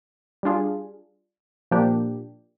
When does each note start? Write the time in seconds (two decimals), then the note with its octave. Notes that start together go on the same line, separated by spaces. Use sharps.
0.43 G3 D4 F4 G#4
1.71 A#2 F3 A#3 D4 G4